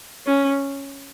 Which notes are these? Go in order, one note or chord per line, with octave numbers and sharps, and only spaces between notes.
C#4